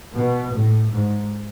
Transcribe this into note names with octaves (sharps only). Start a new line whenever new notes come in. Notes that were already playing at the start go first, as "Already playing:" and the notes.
B2
A2
G#2